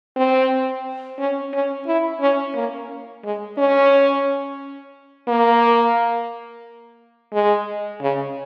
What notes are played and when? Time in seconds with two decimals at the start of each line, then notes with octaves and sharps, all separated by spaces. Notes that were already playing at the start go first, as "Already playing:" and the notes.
0.16 C4
1.19 C#4
1.54 C#4
1.87 E4
2.21 C#4
2.55 A#3
3.24 G#3
3.58 C#4
5.28 A#3
7.33 G#3
8.02 C#3